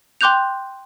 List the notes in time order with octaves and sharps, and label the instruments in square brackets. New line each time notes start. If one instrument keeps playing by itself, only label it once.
[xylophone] G5 C6 D6 F#6 G6 F7